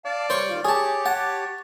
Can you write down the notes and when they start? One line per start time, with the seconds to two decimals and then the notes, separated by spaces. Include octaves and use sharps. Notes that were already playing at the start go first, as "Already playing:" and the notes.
0.05 D5 F5 A5
0.30 G3 C5 C#5 C#6
0.50 D#3 F4
0.65 G4 G#4 C#5 A5
1.06 F#5 A5